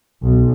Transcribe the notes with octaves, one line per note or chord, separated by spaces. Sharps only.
B1